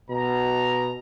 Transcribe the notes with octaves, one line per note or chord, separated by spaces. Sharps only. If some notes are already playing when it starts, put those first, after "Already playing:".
B2 A#5